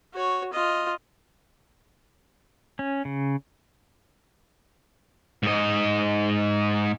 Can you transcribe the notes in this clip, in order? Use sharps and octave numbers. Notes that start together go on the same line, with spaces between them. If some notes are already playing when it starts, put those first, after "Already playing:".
F#4 C#5
F4 D#5
C#4
C#3
G#2 D#5